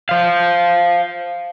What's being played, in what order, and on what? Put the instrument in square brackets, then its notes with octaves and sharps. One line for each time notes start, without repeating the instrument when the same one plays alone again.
[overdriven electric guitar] C5 F5